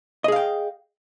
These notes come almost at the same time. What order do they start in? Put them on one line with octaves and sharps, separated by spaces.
D#5 G#4 F5 G5